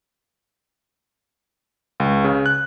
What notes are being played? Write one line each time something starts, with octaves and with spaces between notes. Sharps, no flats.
C#2
C#3
F#6